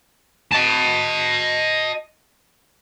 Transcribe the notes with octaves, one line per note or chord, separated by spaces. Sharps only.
D#5 A5